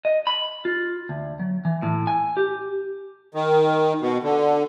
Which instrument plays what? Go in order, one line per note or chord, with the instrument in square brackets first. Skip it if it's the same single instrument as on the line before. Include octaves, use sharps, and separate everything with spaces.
[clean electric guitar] D#5
B5
F4
D2
F#3
E3
A2
G#5
G4
[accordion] D#3
B2
D3